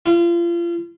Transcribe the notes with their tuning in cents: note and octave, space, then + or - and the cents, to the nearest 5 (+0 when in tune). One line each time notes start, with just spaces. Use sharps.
F4 -35